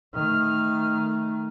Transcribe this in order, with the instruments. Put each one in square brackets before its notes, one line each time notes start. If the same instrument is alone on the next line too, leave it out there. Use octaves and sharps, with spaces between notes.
[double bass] D#3 A3 [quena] F6